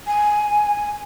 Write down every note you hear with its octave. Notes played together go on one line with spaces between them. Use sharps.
G#5